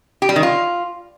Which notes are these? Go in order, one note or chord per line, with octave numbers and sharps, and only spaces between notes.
G4
G3
D#3
F4